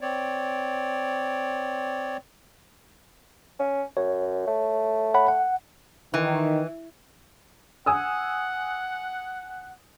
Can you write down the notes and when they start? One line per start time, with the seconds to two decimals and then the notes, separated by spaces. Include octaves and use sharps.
0.01 C4 C#5 D5
3.59 C#4
3.97 F#2 C#5
4.47 A3
5.14 C#5 F#5 B5
5.28 F#5
6.14 D#3 E3
7.86 F#5 G#5 D#6 E6